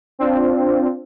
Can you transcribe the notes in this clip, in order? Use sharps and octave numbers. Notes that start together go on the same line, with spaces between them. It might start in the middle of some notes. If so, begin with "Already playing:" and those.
C4 D4 F4